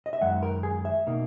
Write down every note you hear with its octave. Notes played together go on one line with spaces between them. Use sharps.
D#5
E5
F#2 D#3 G#3 F#5
A#4
G#4
E5
B2 A#3 D#4